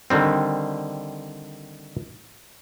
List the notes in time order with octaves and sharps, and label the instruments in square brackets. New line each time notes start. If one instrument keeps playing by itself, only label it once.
[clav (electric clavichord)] D3 D#3 G3 C4